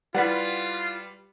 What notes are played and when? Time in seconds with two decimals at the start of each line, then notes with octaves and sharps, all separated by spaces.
0.14 G3 E4 F4 B4 D5 F#5 B6